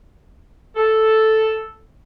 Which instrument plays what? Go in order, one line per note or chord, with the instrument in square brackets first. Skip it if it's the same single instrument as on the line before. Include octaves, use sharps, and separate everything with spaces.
[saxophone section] A4